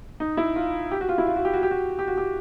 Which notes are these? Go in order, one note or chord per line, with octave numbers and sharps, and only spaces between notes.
D#4
E4
F4
G4
F#4
F4
E4
F4
F#4
G4
F#4
G4
F#4
G4
F#4
G4